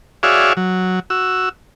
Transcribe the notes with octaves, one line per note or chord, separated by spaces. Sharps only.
F#4 G#4 C#5 D5 E5 F5
F#3
F#4 E6